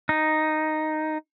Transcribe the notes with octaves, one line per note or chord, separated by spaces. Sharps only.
D#4